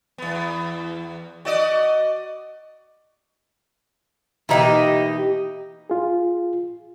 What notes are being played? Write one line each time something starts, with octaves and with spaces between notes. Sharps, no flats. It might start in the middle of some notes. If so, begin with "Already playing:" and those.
E2 B3
F#4 D5 D#5
B2 E3 A#3 D#4 G4 E5
F4 G#4